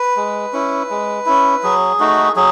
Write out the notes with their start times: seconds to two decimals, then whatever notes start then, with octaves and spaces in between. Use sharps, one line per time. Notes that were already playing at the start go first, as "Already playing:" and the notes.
Already playing: B4
0.17 G#3
0.53 C#4 E4
0.91 G#3
1.26 C#4 E4
1.63 F#3 G#4
2.00 A3 D#4 F#4
2.36 F#3 G#4